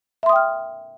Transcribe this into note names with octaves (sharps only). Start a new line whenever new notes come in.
E5 G5 C6 D#6 F6